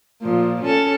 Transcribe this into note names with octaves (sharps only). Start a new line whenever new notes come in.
A#2 F3
C#4 A4